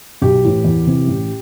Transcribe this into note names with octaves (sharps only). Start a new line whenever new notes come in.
B1 G4
A2 E3
E2
C3 E3
A1